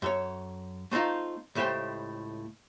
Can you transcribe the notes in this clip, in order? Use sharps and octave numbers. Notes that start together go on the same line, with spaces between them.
F#2 A4 C#5
A3 C4 D4 D#4 F4
C#2 A2 A3 G4 C5 G5